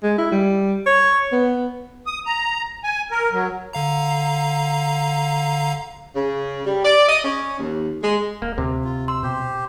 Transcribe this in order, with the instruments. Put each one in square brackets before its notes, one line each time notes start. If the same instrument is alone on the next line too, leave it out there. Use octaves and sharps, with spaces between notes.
[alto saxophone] G#3
E4
G3
C#5
B3
[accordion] D#6
A#5
G#5
A#4
F#3
[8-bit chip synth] D3 F5 A#5
[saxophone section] C#3
G3
D5
D#5
C#4
D#2
G#3
[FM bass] D1 [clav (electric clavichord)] A#3
[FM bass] D2 [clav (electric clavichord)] C3
[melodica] F4
[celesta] C6 [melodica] E6
[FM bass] B2 [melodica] G4 C5